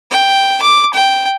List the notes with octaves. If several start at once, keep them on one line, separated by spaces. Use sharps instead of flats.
G5
D6
G5